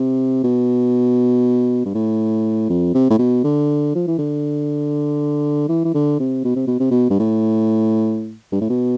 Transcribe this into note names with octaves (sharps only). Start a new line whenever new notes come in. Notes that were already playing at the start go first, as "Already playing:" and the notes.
Already playing: C3
B2
G2
A2
F2
C3
A2
B2
D3
F3
E3
D3
E3
E3
D3
C3
B2
C3
B2
C3
B2
G2
A2
G2
A2
B2